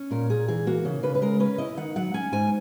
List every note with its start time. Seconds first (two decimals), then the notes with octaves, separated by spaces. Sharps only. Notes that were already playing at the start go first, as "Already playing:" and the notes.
Already playing: C#4
0.11 A#2 A#4
0.30 A#2 G#4
0.48 E3 G#4
0.67 A#3 F#4
0.85 C#3
1.03 C#3 B4
1.15 B4
1.22 G#3 A#4
1.40 C#4 B4
1.58 E4 D#5
1.77 D#3 F#5
1.96 F#3 F#5
2.14 C#4 G#5
2.32 G#2 G#5